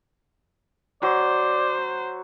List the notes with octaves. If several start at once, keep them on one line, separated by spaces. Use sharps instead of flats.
F#3 C5 D5